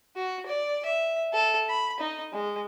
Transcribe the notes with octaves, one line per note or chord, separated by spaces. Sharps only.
F#4
D5
E5
A4
B5
D#4
G#3